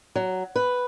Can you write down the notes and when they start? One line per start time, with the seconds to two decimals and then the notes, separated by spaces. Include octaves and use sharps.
0.15 F#3
0.56 B4